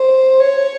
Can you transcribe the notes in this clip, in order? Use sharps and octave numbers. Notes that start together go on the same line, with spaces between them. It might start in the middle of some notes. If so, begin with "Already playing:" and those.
Already playing: C5
C#5